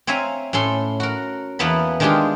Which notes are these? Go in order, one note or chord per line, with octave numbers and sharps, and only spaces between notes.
C4 C#5 E5 F5 G#5 A#5
A2 C#4 A4 C6
F#4 A#4
E2 E3 A#3 B3 A5 B5
D#3 G#3 D4 F4 G4 G#4